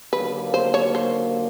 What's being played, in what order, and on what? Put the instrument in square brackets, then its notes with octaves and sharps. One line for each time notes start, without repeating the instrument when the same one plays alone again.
[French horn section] D#2 D3 F#3 A#3 [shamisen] B4
[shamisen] C5
C#5
C5